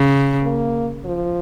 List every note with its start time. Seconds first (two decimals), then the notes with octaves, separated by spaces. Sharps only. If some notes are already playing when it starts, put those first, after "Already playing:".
Already playing: C#3
0.43 A#3
1.05 F3